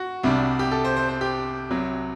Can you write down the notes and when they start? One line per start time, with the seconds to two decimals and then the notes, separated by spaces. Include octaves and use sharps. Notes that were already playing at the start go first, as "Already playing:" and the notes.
Already playing: F#4
0.23 C2 C3 G3 D4
0.59 G4
0.72 A4
0.85 C5
0.96 C5
1.09 C5
1.21 G4
1.71 C2 C3 F#3